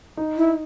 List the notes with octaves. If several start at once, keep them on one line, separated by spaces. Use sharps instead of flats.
D#4
E4